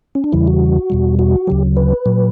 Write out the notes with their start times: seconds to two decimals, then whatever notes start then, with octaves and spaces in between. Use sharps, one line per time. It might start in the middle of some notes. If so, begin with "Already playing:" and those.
0.15 C#4
0.24 D4
0.32 E2 C#3 E3 G3 E4
0.47 F#4
0.90 E2 B2 G3
1.19 F#4
1.47 D2 C#3 F#3 G4
1.77 B4
2.06 A#2 F#3